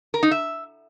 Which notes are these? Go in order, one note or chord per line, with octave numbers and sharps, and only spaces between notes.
A#4
D#4
E5